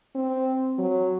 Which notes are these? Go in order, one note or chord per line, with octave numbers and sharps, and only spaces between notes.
C4
F#3